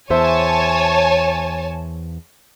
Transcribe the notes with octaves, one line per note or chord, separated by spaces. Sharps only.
E2 C5 C#5 E5 G#5 A5